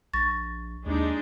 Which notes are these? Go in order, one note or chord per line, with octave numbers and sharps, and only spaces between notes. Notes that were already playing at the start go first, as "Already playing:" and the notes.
A#1 C#6 A6 A#6
D#2 G#3 D4 D#4